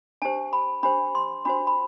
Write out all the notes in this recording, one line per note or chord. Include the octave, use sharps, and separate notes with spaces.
D4 G4 C5 A5
B5
D4 G4 C5 B5
C6
D4 F#4 C5 B5
B5